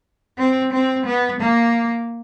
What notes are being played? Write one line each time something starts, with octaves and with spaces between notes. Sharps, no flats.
C4
C4
B3
A#3